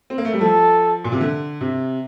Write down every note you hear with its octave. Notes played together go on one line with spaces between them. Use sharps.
C4
A#3
A3
G3
F3 A4
A#2
C3
D3
C3